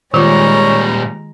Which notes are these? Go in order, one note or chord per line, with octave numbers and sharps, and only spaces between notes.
A#2 D#3 G3 G#3 F4 C#5 A#5